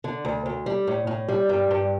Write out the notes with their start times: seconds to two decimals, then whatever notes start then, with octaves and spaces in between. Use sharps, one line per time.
0.04 D3
0.25 D2
0.46 D2
0.66 G3
0.87 A2
1.07 A2
1.29 G3
1.49 G2
1.71 G2